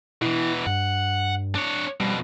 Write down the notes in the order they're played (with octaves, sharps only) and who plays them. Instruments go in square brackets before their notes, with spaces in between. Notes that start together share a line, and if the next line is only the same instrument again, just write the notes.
[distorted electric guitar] B2 E3 [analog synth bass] E4
[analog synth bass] G2 [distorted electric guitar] F#5
[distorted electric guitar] D4 C#5
[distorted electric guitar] F2 B2 [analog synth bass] G3